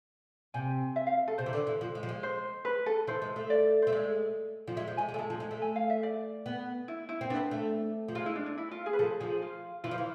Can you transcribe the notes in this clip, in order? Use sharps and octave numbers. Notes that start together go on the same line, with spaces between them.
C3 G#5
E5
F5
A4
C3 C5
E3
D3
E3
F3
G#3
F3
G#3
C5
B4
A4
E3 C5
G#3
A3
D5
A3 C5
G#3 D5
F3
G#3 E5
F3
G#3 G#5
G#3
A3
G#3 A5
F3
G#3
A3
G#5
F5
E5
D5
B3
E4
E4
C4
B3 D4
A3
F3
G#3 F4
E4
D4
D4
E4
F4
G#4
B4
F3 A4
F3 G#4
F4
E3 F4
F3
E3